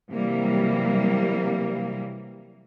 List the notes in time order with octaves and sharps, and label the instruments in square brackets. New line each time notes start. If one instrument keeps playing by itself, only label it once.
[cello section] C3 E3 F#3 G3 A#3